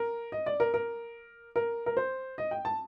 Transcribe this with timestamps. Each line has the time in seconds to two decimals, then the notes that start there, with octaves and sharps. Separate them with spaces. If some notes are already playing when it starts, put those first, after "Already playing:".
Already playing: A#4
0.32 D#5
0.46 D5
0.60 A#4
0.74 A#4
1.56 A#4
1.86 A#4
1.97 C5
2.38 D#5
2.51 G5
2.65 A5